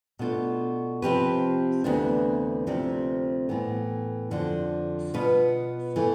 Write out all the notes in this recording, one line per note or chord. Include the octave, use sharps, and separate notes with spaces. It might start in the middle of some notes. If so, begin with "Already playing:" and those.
B2 A3 D4 F4
C3 F3 C4 G4 B4
D2 C3 E3 B3 D4
D2 C3 F3 C4
A2 E3 B3
F2 D3 F3
B2 B3 F4 B4
A2 E3 A3 E4